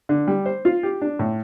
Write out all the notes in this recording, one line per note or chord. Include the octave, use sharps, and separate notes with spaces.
D3
G3
C5
F4
G4
D4
A2